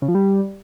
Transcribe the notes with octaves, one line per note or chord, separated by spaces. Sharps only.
C#3
F3
G3